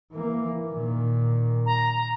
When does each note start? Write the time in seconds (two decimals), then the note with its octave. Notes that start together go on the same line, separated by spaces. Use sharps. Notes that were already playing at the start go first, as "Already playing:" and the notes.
0.12 E3 A#3
0.68 A#2 D#3
1.66 A#5